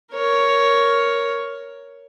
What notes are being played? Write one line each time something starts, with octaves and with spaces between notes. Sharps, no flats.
A#4 C#5